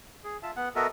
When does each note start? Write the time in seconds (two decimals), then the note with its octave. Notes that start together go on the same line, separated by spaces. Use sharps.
0.24 G#4
0.43 F4 E5 A5
0.56 B3 F#5
0.76 B3 F#4 A4 A#4 D#5 E5